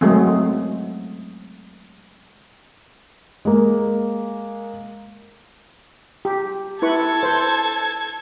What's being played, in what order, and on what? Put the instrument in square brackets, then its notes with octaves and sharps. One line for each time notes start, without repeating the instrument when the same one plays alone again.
[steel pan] F#3 G#3 A3 C4
[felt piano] G#3 A#3
[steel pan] G4
[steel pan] E4 B4 C#6 [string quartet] A4 G#6
[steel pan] B4 C5